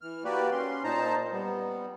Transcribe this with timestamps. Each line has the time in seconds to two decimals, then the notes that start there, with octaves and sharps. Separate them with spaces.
0.01 E3 F6
0.25 A#3 F#4 G4 B4 D5
0.52 C#4 C6
0.84 A#2 D#4 C5 A5 A#5
1.33 G3 B3